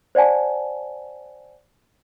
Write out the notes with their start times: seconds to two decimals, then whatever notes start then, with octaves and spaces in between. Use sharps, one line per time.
0.15 C5 D5 F#5 G#5 A5